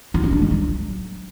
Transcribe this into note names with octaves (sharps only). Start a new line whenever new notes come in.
F4
C#4
D4
G#3
F#3